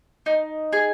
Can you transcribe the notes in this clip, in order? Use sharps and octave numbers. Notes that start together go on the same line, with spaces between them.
D#4
G#4